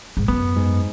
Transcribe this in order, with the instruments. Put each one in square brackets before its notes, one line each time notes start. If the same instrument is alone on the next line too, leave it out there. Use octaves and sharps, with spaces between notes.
[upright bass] G#2
[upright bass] F#2 [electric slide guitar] B3
[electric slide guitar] G#2